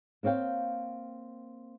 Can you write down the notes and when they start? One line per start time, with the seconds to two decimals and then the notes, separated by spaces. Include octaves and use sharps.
0.23 A#3 C4 C#5 F5 G5